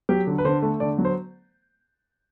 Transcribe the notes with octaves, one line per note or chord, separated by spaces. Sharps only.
F#3 G4
D3
B4
D3 C5
A3
D3 D5
F#3
C5